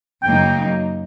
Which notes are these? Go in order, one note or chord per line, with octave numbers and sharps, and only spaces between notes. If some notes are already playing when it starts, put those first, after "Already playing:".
F#2 C#3 F#3 A#3 D#4 G5